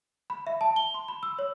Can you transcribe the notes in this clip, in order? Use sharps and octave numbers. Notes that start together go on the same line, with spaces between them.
B5
E5
A5
G7
C6
B5
E6
C#5